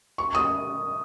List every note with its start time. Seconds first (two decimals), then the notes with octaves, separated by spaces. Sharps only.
0.18 C#6
0.35 D#6